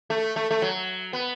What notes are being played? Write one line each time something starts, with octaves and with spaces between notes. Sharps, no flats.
A3
A3
A3
F#3
B3